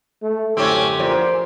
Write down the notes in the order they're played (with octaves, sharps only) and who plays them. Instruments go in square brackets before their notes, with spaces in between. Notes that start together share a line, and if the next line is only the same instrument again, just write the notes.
[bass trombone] A3
[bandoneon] F#2 D3 G4 [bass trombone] A2 [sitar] C4 C#4
[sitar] A#2 [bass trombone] F3 [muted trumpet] C5